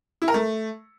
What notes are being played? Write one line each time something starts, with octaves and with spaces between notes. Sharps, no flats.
E4
A#4
A3